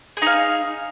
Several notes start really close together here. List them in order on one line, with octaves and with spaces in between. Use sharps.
G#4 D#4 F5